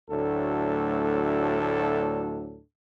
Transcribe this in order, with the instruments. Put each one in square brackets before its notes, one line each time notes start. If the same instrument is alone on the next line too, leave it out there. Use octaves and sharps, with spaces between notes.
[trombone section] D2 A2 F#3 D4 A4